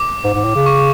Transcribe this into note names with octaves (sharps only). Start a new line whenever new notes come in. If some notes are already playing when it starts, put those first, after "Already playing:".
Already playing: D6
G#2
G#2
A2
C#3
C#6